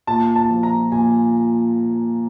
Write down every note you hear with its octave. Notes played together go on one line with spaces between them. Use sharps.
A#2 A5
A5
F3
A#5
A#2 G#5